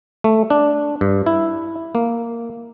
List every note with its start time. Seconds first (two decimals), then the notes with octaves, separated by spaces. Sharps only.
0.24 A3
0.50 D4
1.01 G2
1.26 E4
1.95 A#3